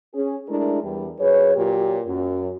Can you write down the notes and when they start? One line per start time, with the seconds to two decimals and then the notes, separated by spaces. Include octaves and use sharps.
0.14 C#4 G#4
0.49 G#3 A3 D4 E4 A#4
0.83 E2 G3
1.20 F#2 G#4 B4 C#5
1.56 A#2 F#3 G4
2.07 F#2